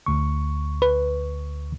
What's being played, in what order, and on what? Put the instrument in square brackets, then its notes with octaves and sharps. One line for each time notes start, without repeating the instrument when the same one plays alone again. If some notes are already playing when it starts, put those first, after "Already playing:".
[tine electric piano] D2 C#6
[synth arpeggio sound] B4